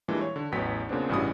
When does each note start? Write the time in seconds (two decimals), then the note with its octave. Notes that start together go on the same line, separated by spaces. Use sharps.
0.08 A#2 E3 G3 G#3 D4 E4
0.21 C#5
0.36 D3
0.52 A1 E2 F#3 B3 G5 B6
0.89 A#2 C#3 B3 C4 D4
1.09 A1 G2 C#3 E3 F#4 D#6